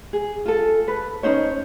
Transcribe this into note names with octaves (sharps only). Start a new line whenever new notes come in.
G#4
F4 A4
B4
C#4 D#4 C5 C#5